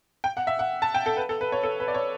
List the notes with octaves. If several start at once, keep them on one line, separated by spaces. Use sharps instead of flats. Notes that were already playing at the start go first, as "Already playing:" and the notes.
G5
F#5
E5
F#5
A5
G5
A4
B4
A4
B4
C#5
A4
B4
D5
C#5